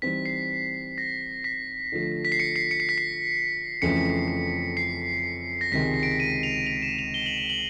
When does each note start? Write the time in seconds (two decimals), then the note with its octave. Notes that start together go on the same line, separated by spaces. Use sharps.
0.02 E3 G3 C4 D#4 B6
0.25 C7
0.98 A#6
1.44 B6
1.92 D3 F3 A3
2.25 B6
2.32 C7
2.39 C#7
2.56 C7
2.71 C#7
2.80 C7
2.89 B6
2.98 C7
3.82 F2 C#3 E3 A3 C#4 C#7
4.77 C7
5.61 A#6
5.72 C#2 C3 D#3 G#3 B6
6.03 D7
6.20 D#7
6.43 F7
6.67 F7
6.82 E7
6.99 F7
7.14 G7
7.26 F#7
7.38 F#7
7.49 F#7